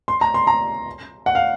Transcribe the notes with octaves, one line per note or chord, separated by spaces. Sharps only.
C6
A#5
C6
A#5
F#5
F5